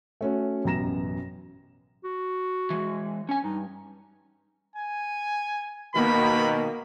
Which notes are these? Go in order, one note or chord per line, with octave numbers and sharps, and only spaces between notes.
A3 C#4 F#4
A1 F#2 B2 A#5 A#6 E7
F#4
E3 G#3
C#4 G#5
G2 D#4
G#5
B2 D#3 A#3 B5